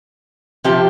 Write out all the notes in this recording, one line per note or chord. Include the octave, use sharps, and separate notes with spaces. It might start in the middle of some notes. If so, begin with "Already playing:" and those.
C3 F3 G4